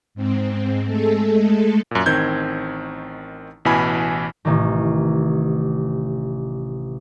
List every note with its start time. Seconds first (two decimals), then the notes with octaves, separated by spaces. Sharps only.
0.15 G#2 C4
0.85 G#3 A3 A4
1.91 F#2 A#2
2.06 A1 D#3 C4 G6 G#6
3.65 A1 B2 E3 G#5 B5
4.45 A1 C3 D#3